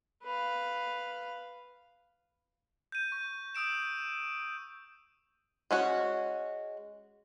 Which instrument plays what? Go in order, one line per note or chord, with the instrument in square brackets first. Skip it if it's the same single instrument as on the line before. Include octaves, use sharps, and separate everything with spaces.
[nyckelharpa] B4 F5
[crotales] G6 D#7
C#6
D#6 E6 D7 E7
[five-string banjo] G#3 C#4 F#4